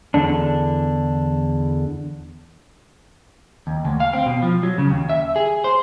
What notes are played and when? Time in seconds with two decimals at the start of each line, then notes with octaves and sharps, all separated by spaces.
0.14 E2 D3 D4
3.67 D#2
3.85 D2
4.00 F5
4.13 C4
4.26 B2
4.43 F3
4.63 F#3
4.78 C#3
4.90 D#2
5.09 E5
5.36 G#4
5.64 C5